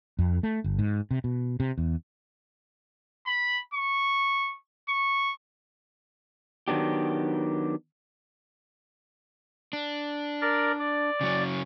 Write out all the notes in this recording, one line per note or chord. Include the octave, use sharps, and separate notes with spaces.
F2
A3
G1
G#2
C3
B2
C3
E2
B5
C#6
C#6
D#3 F#3 B3 D4 G4
D4
A#4 D5
D5
C#3 F#3 C#4